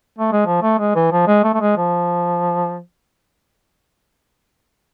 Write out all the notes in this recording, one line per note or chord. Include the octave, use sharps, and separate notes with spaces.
A3
G#3
F3
A3
G#3
E3
F3
G#3
A3
A3
G#3
F3